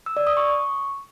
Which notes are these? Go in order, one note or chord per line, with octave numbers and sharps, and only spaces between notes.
E6
D5
D#6
C#6